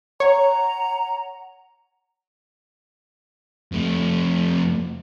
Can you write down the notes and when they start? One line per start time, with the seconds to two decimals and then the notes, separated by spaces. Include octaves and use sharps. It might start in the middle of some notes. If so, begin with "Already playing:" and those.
0.20 C#5 F#5 A#5
3.72 F2 A3